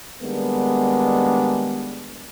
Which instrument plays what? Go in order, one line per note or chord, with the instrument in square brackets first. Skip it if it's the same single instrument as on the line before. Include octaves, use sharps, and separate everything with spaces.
[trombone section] D#3 G3 G#3 A#3 B3 D4